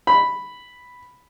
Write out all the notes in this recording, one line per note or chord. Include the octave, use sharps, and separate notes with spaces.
B5